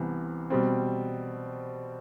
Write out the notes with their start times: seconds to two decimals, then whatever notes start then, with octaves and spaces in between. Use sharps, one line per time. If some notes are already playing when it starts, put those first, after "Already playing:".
Already playing: C2 C3 E3 B3
0.50 B2 G3 C4